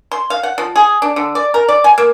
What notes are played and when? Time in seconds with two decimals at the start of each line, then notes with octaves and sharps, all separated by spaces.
0.11 C6
0.30 F5
0.43 F#5
0.58 F3
0.76 G#4
1.02 D4
1.16 D3
1.35 D5
1.54 A#4
1.68 D5
1.84 G#5
1.98 A#3